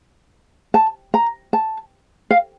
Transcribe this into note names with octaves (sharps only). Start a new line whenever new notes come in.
A5
A#5
A5
F5